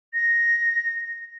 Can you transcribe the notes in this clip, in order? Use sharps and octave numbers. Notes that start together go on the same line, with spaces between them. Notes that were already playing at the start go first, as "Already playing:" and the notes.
A#6